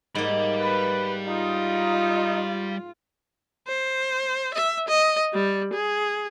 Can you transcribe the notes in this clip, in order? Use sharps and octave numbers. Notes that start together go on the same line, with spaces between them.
G#2 G3 A#3 B5
B4
D#4 F4
C5
E5
D#5
G3
G#4